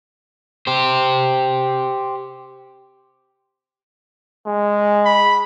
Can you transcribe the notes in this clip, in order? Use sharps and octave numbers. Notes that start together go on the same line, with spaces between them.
G4 C5
G#3
B5